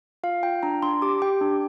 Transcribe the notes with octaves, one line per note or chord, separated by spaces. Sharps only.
F4 F5
F4 G5
D4 A#5
D4 C6
G4 D6
G4 G5
D4